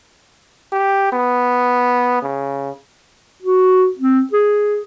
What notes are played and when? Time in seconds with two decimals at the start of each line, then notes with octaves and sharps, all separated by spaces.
0.72 G4
1.13 B3
2.23 C#3
3.42 F#4
3.99 C4
4.33 G#4